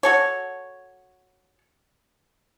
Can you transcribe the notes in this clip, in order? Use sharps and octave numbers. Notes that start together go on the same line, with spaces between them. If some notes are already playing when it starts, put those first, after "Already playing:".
F#4 A4 C#5